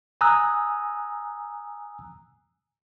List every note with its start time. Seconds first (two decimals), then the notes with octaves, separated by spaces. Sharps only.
0.21 G#5 A#5 D#6 E6 F#6